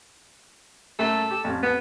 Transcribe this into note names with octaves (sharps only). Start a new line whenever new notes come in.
F#2 A3 A4
G4
A1 F2
B3